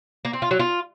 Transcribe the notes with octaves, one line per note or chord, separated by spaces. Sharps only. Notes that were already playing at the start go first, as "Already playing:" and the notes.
A#3
C4
F4
F#3
F4